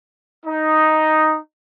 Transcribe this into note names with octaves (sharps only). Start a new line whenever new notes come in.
D#4